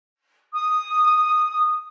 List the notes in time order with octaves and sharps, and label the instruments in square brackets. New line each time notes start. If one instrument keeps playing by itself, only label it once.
[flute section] D#6